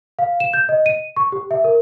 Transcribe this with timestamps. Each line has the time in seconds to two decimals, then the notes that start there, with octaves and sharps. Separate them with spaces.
0.19 F5
0.40 E7
0.53 G6
0.69 D#5
0.86 D#7
1.17 C#6
1.32 G4
1.51 E5
1.64 A#4